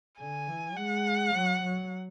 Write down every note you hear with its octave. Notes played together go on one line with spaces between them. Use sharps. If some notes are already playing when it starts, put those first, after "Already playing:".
D3 G#5
E3
G#3 F#5
F#3
F#3